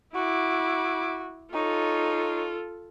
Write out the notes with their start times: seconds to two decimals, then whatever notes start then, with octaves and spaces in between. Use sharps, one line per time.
0.15 E4 F#4 D6
1.54 D#4 F4 A4 C#5